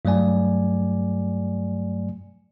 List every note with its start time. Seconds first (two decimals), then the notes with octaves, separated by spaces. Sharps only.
0.05 G2 F#3 A3 D5 G#5